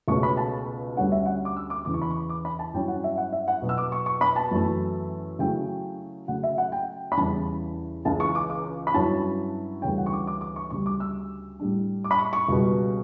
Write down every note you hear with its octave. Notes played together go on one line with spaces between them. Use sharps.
C#2 B2 A3 C#4 C#6
B5
A5
D2 D3 G3 C#4 F#5
E5
F#5
D6
E6
D6
E2 C#3 E3 D6
C#6
B5
C#6
D6
B5
A5
G2 F#3 C#4 E4 G5
F#5
E5
F#5
E5
F#5
B2 F#3 B3
E6
D6
C#6
C#6
B5
A5
F#2 E3 A3 E4
C#3 F#3 A3 E4 G5
C#3 F#3 A3 F#5
E5
F#5
G5
B5
E2 C#3 G3 C#4 E4 A5
C#2 C#3 E3 A5
C#6
D6
D6
B5
G2 F#3 C#4 E4 A5
D2 C#3 E3 G3 C#4 G5
F#5
C#6
D6
D6
D6
C#6
D2 C#3 G3 C#6
D6
E6
A2 G3 D4
D6
B5
C#6
C#6
C#2 B2 G3